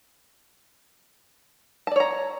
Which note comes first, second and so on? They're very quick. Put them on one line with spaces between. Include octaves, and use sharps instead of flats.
A5 D5 C#5 A#5